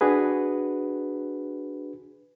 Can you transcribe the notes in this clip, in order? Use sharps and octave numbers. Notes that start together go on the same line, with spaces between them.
D4 F#4 G#4 B4